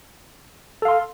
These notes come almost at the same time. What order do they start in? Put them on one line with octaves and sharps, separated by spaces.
A4 F5 C6